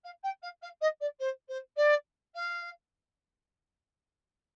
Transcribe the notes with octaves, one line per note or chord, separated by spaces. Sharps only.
F5
G5
F5
F5
D#5
D5
C5
C5
D5
F5